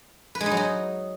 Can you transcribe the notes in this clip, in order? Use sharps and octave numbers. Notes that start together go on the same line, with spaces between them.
B4
G#3
D#4
F#3
D#4